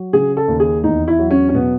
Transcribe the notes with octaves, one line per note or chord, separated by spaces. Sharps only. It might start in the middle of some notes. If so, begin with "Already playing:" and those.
Already playing: F#3
C#3 G#4
A4
D#2
G#4
E2 D#4
E4
F#3
C#4
C#4
B2 B3